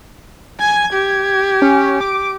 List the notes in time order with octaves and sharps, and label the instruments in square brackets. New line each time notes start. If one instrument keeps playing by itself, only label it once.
[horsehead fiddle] G#5 [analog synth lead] G#6
[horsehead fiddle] G4
[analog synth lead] C#4
D6